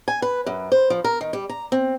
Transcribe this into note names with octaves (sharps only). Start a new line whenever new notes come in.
G#5
B4
F#2
C5
F3
A#4
D#3
G3
A#5
C4